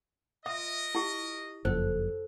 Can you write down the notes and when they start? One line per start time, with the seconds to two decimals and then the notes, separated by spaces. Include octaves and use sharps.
0.46 F4 A#4 D#5 E5 D#6
0.95 E4 G4
1.65 F#1 F2 A4 C5